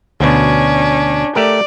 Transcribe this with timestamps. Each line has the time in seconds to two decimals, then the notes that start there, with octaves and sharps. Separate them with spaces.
0.20 D2 B2 C#4 D4
1.36 A3 G4 A#4 D5